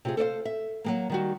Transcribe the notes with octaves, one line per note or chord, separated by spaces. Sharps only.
C3 F4 G#4
A4 C5 D5 F5
E5
F#3 G#3 A#3
D#3 G3 F#4